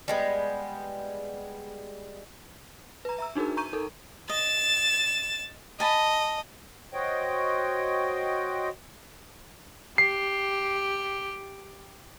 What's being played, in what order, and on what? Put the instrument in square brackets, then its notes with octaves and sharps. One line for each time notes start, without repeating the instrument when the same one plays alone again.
[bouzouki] G3 G#3 B3
[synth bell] B4 A#5
E5 A#5 E6
D4 D#4 F#4 G#4 A#4
A#5 C#6 G6 D#7
D#4 A4 A#4
[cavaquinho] D#5 [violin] A6 E7
[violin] D#5 [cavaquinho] G#5 A5 B5
[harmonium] F#4 C5 C#5 D#5 G5
[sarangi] G4 [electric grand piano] C7